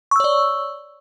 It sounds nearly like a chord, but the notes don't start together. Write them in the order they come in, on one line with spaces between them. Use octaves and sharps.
C#6 E6 C#5 D5